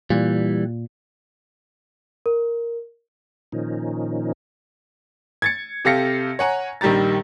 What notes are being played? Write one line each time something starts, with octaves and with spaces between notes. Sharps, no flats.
A#2 E3 G3
A#4
A#2 D#3 F3 C#4 D#4
G#6 A6 C#7
C3 G4 A4 F5 A#6 C#7
C#5 F#5 G#5 A#5
A#1 D#3 G3 G4 A#5 A6